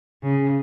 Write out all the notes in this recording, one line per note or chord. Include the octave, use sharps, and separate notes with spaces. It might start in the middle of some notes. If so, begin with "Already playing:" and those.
C#3